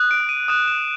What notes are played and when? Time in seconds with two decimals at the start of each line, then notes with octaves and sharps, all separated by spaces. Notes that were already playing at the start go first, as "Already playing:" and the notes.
Already playing: D#6 F#6
0.11 D7
0.29 D#7
0.48 D#6 F#6 E7
0.67 E7